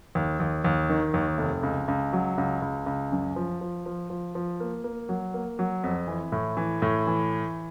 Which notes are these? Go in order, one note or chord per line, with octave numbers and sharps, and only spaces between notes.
D#2
D#2
D#2
D#3
D#2
F1
C#2
C#2
F#3
C#2
C#2
C#2
F#2
F3
F3
F3
F3
F3
A#3
A#3
F#3
A#3
F#3
F2
E3
A2
E3
A2
E3